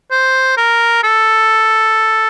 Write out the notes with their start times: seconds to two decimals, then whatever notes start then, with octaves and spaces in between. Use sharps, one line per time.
0.11 C5
0.57 A#4
1.03 A4